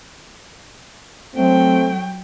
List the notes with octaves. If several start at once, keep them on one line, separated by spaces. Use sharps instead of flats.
F#3 A3 C4 G5